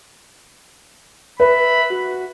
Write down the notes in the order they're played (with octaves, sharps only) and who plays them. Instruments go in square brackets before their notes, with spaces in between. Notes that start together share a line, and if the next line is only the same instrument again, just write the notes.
[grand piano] B4 [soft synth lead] E5 [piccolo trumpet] B5
[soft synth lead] F#4